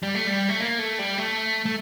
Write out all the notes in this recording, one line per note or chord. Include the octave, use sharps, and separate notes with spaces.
G3
A3
G3
A3
A#3
A3
G3
A3
A3